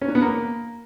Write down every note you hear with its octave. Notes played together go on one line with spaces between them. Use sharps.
C#4
D4
B3
A#3